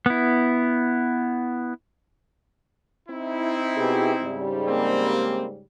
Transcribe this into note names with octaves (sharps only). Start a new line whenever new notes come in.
B3 E4
C4 D#4 E4
B2 G4 G#4
G#2 C#3 G3
A#3 C4